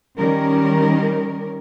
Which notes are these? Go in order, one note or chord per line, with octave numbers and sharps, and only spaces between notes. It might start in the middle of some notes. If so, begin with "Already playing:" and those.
D#3 G3 C#4 A#4